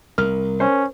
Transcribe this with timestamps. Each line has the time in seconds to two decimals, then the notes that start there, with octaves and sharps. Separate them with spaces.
0.18 C2 A#4 F6
0.60 C#4 C5